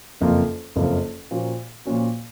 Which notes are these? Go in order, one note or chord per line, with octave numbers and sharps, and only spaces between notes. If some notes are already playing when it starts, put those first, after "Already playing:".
F#1 F2 F3 A#3 F4
F#1 F2 F3 A#3 F4
A#2 F3 A#3 C#4 F#4
A#2 F3 A#3 C#4 F#4